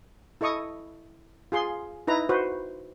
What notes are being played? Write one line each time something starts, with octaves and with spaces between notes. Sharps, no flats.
E4 A4 D#5 C#6 D#6
F4 G#4 C6
D#4 E4 B4 A#5
F#4 B4 C5